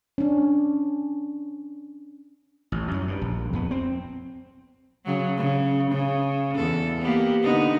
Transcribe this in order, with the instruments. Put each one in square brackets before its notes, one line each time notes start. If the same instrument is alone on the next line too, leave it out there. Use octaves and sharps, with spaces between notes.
[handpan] C#4 D4
[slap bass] A1
F#2 F#3
G2
A#1
F2 B3
C4
[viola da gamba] C#3 F#3
C#3
C#3
E2 A4
A#3 B3 G4
D3 B3 D#4